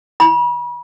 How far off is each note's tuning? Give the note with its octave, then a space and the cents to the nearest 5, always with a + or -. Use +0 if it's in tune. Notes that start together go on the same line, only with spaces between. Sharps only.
B5 -40